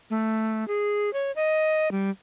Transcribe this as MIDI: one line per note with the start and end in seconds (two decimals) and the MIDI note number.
0.10 0.67 57
0.68 1.12 68
1.13 1.31 73
1.36 1.91 75
1.91 2.10 55